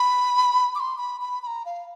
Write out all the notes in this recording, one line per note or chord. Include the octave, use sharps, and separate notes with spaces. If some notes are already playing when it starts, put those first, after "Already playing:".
Already playing: B5
D6
C6
B5
B5
B5
A#5
F5